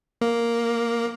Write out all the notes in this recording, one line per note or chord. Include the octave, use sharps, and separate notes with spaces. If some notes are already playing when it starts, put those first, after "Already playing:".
A#3